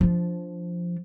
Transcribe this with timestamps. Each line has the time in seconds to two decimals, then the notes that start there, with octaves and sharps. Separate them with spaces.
0.01 F3 D4